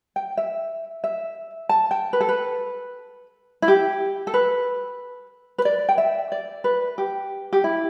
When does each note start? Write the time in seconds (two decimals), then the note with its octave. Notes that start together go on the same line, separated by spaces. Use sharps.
0.16 G5
0.37 E5
1.04 E5
1.69 A5
1.91 G5
2.13 B4
2.21 A4
2.29 B4
3.62 E4
3.68 G4
4.27 A4
4.34 B4
5.58 B4
5.65 D5
5.89 G5
5.98 E5
6.32 D5
6.64 B4
6.98 G4
7.53 G4
7.64 E4